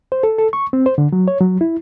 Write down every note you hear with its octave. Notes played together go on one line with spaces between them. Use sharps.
C5
A4
A4
C#6
C4
C5
D3
F#3
C#5
F#3
E4